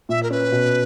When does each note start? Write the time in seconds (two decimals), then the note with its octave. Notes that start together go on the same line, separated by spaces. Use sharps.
0.09 A#2 E5
0.23 A#4
0.30 C#4 B4
0.52 B2